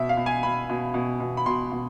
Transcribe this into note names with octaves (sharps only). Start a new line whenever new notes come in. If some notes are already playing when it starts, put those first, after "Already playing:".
Already playing: B2 E5
F5
B2
G#5
B2 B5
B2
B2
B2
B5
B2 C6
B2